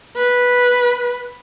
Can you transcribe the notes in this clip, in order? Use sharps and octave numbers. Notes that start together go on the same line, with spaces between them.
B4